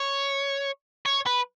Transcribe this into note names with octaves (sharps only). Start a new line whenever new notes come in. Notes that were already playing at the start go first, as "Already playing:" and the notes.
Already playing: C#5
C#5
B4